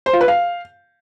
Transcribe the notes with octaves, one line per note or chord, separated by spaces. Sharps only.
C5
F4
B4
F5